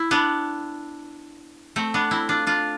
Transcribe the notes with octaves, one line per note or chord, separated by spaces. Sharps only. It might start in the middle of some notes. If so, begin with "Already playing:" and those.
Already playing: E4
B3 D4
A3 C4
B3 D4
C4 E4
D4 F4
D4 F4